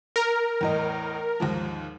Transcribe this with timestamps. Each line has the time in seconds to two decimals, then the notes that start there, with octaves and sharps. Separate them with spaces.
0.16 A#4
0.61 E2 A2 D#5
1.40 D#2 G#2 F3